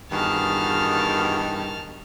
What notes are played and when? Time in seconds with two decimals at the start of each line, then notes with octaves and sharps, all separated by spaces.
0.12 E2 G2 D#3 F#4 G#4 F5 A5 F6